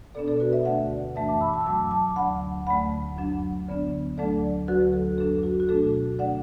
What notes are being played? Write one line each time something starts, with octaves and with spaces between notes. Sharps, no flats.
B2 B3 D4 A4 D5
A4 D5
F#4 B4
B4 E5
D2 D3 A3 D4 D5 F#5
F#2 E3 A3 D4 E5 A5
A5 D6
B5 E6
A5 D6
E6
F#2 F#3 A3 A5 D6
A5 D6
D2 D3 F#3 F#5 B5
D2 D3 A3 F#5 B5
F#2 F#3 D4
D2 D3 B3 D4
D2 D3 F#3 A3 D4 A4 D5
D2 D3 F#3 F#4 B4
A4
F#2 F#3 D4 A4
F#4
F#4
B2 A3 D4 A4
D3 A3 D4 D5 F#5